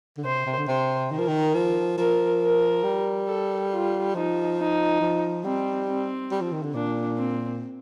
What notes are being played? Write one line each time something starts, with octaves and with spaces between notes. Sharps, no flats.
D3
C3 C5
C3
D3
C3 C5
D#3 A#4
F3
D#3
F3
F3 A#4
A#4
G3
A4
F4
F3 D#4
D#4
F3
G3 C4
C4
G3
F3
D#3
D3
A#2 D4
C4